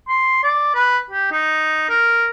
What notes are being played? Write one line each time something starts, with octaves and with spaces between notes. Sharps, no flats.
C6
D5
B4
G4
D#4
A#4